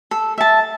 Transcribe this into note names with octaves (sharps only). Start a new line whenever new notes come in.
A4
E5 A5